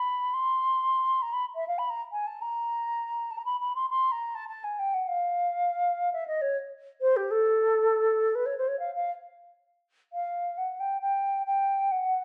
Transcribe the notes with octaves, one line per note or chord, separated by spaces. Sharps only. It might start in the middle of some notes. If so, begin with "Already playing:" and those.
Already playing: B5
C6
A#5
B5
E5
F5
B5
A#5
G#5
A5
A#5
A5
A#5
B5
B5
C6
C6
A#5
A5
A5
G#5
G5
F#5
F5
E5
D#5
C#5
C5
G4
A4
B4
C#5
C5
C#5
F5
F5
F5
F#5
G5
G5
G5
F#5